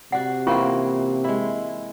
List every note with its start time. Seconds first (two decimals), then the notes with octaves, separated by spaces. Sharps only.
0.12 C3 F#4 D5 F#5
0.47 E3 A#3 C4 C#4 F4 C#6
1.24 G#3 E4